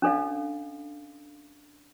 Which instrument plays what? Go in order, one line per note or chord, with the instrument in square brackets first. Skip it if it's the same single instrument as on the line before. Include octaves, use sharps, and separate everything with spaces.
[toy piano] C#4 D4 A4 D#5 F5